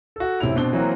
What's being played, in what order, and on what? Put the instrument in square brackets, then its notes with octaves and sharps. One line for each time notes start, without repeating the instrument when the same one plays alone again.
[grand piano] F#4 A4
F1 C3 C#4 E4 F7
B2 C4 D4 G7
E3 F#3 A#3 C4 F#4